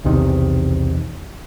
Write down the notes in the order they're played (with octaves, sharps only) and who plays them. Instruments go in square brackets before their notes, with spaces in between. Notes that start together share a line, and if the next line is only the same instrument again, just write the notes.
[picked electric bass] B1 E2 C3 D#3